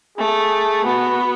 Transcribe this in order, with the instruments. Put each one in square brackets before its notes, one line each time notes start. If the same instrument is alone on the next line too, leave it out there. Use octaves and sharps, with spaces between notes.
[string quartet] A3 [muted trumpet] G#4
[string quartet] B3 [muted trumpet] F#4